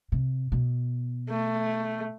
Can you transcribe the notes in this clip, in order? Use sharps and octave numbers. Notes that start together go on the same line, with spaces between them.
C3
B2
A3